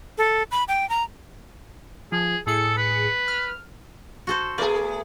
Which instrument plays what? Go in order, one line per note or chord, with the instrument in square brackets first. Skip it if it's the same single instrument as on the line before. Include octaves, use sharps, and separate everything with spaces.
[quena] A4
B5
G5
A#5
[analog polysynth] F3 [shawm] G#4
[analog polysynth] A2 G#4 C#7 [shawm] A4
[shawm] B4
[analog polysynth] F6
[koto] F#4 A4 C5
[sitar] A3 G#4 [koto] B3 D5